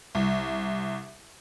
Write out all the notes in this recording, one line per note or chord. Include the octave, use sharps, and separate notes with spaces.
C2